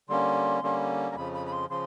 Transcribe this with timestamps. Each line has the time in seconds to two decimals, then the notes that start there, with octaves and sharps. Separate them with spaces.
0.08 D3 G3 A#3 C#4 C6
0.62 D3 G3 A#3 C#4
1.11 A#5
1.16 F2 C#3 F3 B5
1.34 B5
1.46 B5
1.52 C6
1.70 C#3 F3 C6